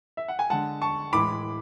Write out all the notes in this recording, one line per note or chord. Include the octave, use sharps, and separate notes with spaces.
E5
F#5
G#5
D3 G#3 F#5 A5
A5 C#6
A2 E3 G#3 B5 D6